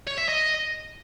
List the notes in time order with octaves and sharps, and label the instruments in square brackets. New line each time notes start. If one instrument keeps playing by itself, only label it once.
[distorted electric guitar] C#5
E5
D#5